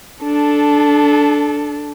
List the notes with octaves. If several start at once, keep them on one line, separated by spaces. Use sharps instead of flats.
D4 A4